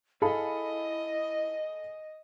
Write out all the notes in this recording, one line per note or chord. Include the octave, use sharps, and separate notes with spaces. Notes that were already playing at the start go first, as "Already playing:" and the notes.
E4 G#4 A4 D#5 F5 B5